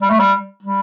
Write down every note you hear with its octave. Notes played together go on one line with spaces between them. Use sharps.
G3
A3
G3
G3